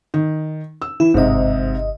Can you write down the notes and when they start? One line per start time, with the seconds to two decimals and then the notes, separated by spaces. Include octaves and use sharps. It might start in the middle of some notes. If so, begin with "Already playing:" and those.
0.14 D#3
0.82 E6
1.00 E3 E4
1.14 G1 G#2 C3 D#5